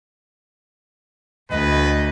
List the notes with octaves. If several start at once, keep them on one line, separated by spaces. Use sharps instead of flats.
D2 B4 D#5